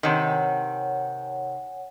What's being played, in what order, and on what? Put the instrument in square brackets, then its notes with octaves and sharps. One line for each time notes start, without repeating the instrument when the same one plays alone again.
[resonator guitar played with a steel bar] C3 D#3 [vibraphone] C#5 F#5 G#5